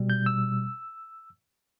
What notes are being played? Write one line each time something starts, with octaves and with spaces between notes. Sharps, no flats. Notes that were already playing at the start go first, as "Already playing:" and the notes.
Already playing: B2 G3
G6
E6